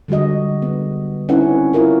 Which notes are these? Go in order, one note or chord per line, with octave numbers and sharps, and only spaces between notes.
D3 G3 G#3 F#4 D#5
B3
C4 C#4 D#4 E4 B4 F#5
E4 F4 A#4 C#5